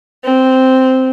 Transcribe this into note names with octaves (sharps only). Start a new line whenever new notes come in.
C4